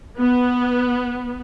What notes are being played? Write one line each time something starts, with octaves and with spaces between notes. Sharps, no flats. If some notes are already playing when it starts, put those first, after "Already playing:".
B3